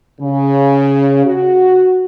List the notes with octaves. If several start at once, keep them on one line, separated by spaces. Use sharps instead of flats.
C#3
F#4